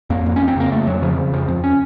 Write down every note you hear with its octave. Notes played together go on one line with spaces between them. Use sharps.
F2 A#3
F2
C#4
F2
C4
C#3 A#3
F2 A3
F2 F#3
C#3 F3
C#3
F2 F3
F2
C#4